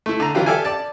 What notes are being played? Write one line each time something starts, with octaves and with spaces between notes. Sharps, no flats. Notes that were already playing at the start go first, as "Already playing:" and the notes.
A3 E4
D3 A#5
E3 F#3 F4 G4
G4 A4 D5 E5 F5 G#5
D5 A5